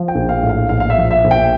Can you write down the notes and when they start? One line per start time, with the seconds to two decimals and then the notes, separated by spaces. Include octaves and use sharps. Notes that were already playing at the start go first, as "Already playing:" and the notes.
Already playing: F3
0.08 G5
0.15 A#1
0.29 F5
0.43 A2
0.49 F5
0.69 A#1 F5
0.80 F5
0.90 E5
0.97 F3
1.11 E5
1.24 A#1
1.31 G5